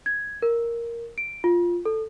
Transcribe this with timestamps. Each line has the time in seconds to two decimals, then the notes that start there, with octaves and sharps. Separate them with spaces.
0.06 G#6
0.42 A#4
1.18 D7
1.44 F4
1.85 A4